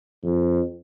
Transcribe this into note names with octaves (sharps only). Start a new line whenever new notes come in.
F2